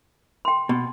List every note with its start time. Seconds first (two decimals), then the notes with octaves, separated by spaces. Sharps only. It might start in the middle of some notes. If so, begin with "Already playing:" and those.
0.45 G5 C6
0.69 B2